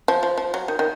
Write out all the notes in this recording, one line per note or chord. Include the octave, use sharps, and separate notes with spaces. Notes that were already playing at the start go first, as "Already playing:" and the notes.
F3
F3
F3
F#3
D#3
D#3